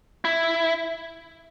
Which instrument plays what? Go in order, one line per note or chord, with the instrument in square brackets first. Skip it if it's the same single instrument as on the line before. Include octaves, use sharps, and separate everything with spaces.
[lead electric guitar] E4